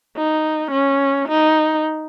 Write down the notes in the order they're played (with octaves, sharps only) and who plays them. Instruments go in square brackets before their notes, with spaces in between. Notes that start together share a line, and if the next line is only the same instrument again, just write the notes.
[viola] D#4
C#4
D#4